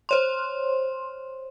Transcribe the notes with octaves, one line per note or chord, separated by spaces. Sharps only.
C5 C#5 C6